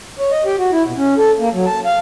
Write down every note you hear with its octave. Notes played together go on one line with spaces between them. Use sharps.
C#5
D#5
G4
F#4
E4
B2
C#4
A4
A#3
F#3
A5
F5